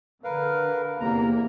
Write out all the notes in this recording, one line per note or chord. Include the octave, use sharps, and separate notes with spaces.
D3 A#4 B4 F5
E2 C3 A#3 A#5